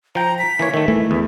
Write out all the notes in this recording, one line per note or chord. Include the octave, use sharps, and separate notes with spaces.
F3 G5 A#5
B6
E3 A#3 C#5
D#3 A3 E5
E3 A3
E2 E4